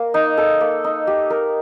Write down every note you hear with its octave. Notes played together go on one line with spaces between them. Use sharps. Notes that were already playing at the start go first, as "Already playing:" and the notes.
Already playing: A#3
D#4
A4
A#3
D#4
G4
A#4